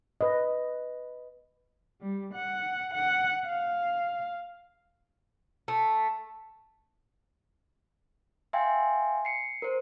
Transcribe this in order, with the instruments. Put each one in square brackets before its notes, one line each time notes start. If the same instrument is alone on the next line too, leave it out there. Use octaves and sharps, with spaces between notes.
[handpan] B4 D#5
[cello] G3
F#5
F#5
F5
[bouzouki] A3
[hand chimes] E5 F5 G5 G#5 C6
C7 C#7
A#4 C5